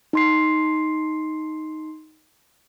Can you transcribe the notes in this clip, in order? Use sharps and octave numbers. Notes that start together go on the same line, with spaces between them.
D#4 C6 C7